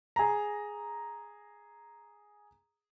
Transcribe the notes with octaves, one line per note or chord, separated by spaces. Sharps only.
G#4 A#5